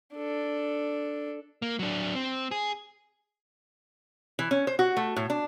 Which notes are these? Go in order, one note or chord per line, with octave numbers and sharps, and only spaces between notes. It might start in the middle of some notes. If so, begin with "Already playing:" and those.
D4 A4
A#3
F#3 D4
C4
G#4
E3
C#4
C5
F#4
A3
A2
D4